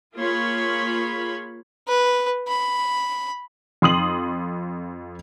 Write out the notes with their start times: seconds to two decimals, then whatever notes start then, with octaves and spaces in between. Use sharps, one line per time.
0.15 A#3 F4 G#4 C#5 B5 C6
1.88 B4
2.48 B5
3.82 F2 C6 D#6 F#7